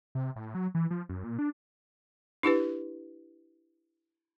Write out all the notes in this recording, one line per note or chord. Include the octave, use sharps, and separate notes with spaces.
C3
A2
F#3
E3
F3
F#2
A#2
D4
D4 E4 G4 B4